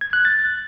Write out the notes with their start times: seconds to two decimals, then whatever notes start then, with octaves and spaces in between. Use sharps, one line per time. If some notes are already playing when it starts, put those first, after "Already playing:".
0.01 G#6
0.13 F#6
0.25 A6